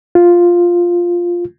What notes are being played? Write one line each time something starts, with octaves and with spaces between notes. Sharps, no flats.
F4